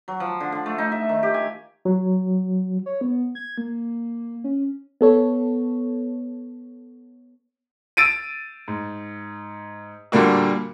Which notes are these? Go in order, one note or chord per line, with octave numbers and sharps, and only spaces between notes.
F#3
F3
D3
D3
A3
D#4
E5
D#3
G4
G#5
F#3
C#5
B3
G#6
A#3
C#4
B3 A4 C#5
E6 A6 D7 D#7
G#2
A#2 D3 G3 A#3 F#4